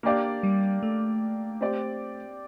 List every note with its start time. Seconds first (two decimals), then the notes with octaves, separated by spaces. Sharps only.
0.03 A#3 D4 G4 D5 F5
0.43 G3
0.83 A3
1.61 C4 G4 D5